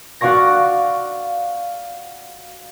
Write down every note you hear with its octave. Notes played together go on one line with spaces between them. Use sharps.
F#4 D5 F5 C#6 A#6